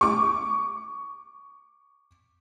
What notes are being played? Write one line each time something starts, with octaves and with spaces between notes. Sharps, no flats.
C#6 D6